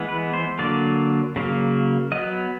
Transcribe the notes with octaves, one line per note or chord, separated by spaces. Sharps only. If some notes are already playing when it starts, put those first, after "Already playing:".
Already playing: E3 G#3 B3
B4
C5
D3 F#3 A#3 D5
C#3 F#3 A#3
F#3 B3 D#5